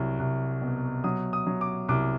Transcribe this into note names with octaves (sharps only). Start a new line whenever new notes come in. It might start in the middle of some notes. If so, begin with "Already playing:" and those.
Already playing: C2 F#3
C2
B2
F#3 D#6
D#6
F#3
D6
C2 D6